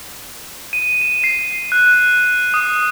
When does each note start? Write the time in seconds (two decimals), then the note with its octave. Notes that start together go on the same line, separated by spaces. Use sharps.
0.73 D#7
1.01 E7
1.24 C7
1.72 F#6
2.54 D#6